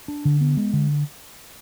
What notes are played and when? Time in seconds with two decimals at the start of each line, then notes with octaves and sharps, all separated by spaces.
0.08 D4
0.25 D3
0.41 B3
0.57 G#3
0.73 D3